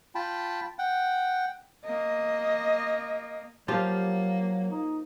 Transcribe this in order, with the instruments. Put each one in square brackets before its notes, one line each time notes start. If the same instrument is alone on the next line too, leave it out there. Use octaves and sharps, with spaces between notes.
[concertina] F4 G5 A5 B5
F#5 G5
[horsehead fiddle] A#3 D#5
[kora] F3 F4 G4 [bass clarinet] F#3 [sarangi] A#3
[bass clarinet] D#4